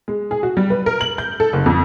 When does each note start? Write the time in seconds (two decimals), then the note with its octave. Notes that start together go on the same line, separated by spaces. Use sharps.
0.08 G#3
0.31 G#4
0.43 F#4
0.57 G3
0.70 B4
0.86 A#4
1.01 F#7
1.18 G6
1.40 A4
1.53 F#1
1.66 F2